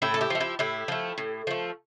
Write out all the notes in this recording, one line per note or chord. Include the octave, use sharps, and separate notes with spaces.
A2 E4 G4
A4
E4 G4
F3 A3
E4 G4
A2 E4 G4
F3 A3
A2
F3 A3